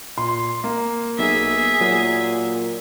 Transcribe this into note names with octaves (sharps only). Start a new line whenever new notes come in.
A#2 C6
A#3
B1 G#4 E5
A#2 F#3